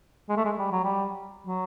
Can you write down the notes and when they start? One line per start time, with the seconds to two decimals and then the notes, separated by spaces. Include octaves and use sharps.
0.29 G#3
0.37 A3
0.45 G#3
0.58 G3
0.71 F#3
0.84 G3
1.47 F#3